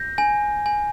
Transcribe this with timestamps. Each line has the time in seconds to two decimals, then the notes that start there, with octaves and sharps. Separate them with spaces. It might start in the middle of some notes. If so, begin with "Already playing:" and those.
Already playing: G6 A#6
0.18 G#5
0.66 G#5